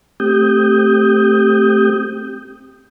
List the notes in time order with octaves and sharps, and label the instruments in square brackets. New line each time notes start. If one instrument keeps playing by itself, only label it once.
[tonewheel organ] A3 C4 G4 D#6 G6